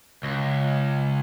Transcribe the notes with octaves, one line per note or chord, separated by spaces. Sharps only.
C#2